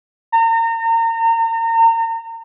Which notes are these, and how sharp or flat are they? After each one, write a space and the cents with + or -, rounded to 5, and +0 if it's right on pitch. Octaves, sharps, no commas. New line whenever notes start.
A#5 -35